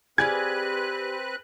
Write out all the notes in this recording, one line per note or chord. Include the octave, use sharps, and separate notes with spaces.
C4 G4 G#4 B4 D5 F5 F#6 G#6